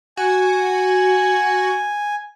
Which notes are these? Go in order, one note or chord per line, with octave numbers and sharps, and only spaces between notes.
F#4 G#5